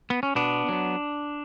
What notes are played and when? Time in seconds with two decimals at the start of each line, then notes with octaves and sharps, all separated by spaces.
0.10 B3
0.23 C#4
0.35 B2 B3 D4
0.69 F#3 B3